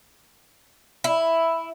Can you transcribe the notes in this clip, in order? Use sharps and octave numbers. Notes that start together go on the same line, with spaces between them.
E4